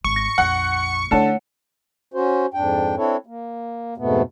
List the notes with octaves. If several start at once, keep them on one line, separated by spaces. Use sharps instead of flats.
G#1 C#6
A#6
A#1 F2 F#5
D3 A3 E4 C#5 F#5 A5 C#7
C#4 F#4 C5
F2 G#2 D4 G5
C4 D4 E4 A4 C#5
A#3
F2 G#2 B2 A3 B3